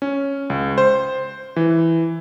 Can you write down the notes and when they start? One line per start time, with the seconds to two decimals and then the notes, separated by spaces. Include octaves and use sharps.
0.02 C#4
0.50 C#2
0.78 C5
1.56 E3